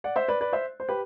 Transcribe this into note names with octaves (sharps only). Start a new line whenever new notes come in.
D5 F#5
C5 E5
B4 D5
B4 D5
C5 E5
C5
G4 B4